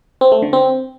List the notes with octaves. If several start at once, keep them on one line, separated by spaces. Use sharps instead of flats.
C4
A3
D3
C4